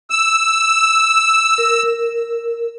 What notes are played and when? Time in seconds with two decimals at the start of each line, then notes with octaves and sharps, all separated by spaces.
0.10 E6
1.58 A#4